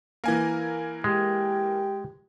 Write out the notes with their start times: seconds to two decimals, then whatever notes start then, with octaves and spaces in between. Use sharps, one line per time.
0.24 E3 A#3 A#4 G#5
1.04 G#3 G4